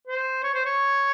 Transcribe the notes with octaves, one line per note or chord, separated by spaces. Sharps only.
C5
C#5
C5
C#5